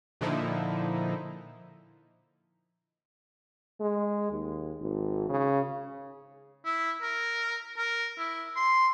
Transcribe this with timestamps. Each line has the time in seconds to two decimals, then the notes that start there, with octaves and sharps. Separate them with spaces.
0.21 A#2 D3 F3 D#4 E4
3.81 G#3
4.32 D#2
4.81 G#1
5.29 C#3
6.65 E4
7.02 A#4
7.78 A#4
8.18 E4
8.56 C6